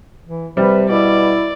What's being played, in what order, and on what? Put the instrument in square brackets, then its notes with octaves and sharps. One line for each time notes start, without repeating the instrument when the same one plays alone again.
[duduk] E3
[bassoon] C3 [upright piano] G3 [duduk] B4
[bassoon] B2 [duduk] E4 [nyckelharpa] D5